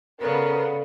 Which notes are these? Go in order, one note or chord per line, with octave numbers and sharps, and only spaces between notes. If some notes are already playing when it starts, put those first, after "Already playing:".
C#3 B3 A4 A#4 D5 F5